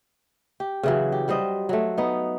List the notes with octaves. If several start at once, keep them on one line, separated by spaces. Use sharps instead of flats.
G4
C#3 E3 F#3
G4
F#3 G3 C5 D#5
F#3 A3
B3 D#4